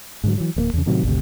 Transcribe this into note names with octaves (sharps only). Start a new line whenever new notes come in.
G#2 D3 F#3
E3 F#3
D1 A3 A#3
E2 C#3
A2 C3 D#3 F#3
G#1 D2 C3